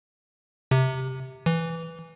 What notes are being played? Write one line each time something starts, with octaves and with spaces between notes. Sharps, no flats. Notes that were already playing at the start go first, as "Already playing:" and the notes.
C3
E3